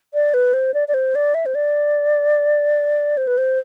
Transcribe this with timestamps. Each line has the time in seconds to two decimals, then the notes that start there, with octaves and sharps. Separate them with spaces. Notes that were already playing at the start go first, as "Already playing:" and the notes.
0.14 D5
0.34 B4
0.53 C5
0.74 D5
0.88 D5
0.94 C5
1.15 D5
1.34 E5
1.46 C5
1.55 D5
3.17 C5
3.27 B4
3.38 C5